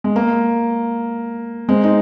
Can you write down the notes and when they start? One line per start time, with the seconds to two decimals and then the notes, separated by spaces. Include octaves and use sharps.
0.04 G#3
0.16 A#3
1.69 G#3 C4
1.83 D#4